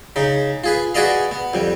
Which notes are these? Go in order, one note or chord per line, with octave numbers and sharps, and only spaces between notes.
C#3 D#4
F4 G#4 B4
F#4 G#4 B4 D5 D#5 F5
B3
F2 G3